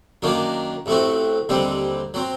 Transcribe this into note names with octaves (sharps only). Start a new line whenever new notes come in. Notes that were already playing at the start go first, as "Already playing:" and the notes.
F#2 D#3 F#3 A#3 D4
A1 A2 A3 C4 F#4
D#2 D3 G3 C4
F#3 C4